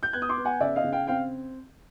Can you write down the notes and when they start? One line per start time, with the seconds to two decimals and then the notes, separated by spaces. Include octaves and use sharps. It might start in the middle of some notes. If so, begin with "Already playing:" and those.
0.03 G6
0.13 B3 F#6 G#6
0.22 D#6
0.29 C6 D6
0.37 B3
0.45 F#5 G#5
0.60 C#3 D5 E5
0.76 D#5 F5
0.84 C#3
0.92 F5 G5
1.07 C4 F5 G5